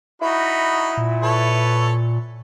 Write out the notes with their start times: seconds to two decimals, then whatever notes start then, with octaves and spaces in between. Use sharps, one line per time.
0.22 D#4 E4 F#4 B5
0.98 A#2
1.22 A4 B4 C#5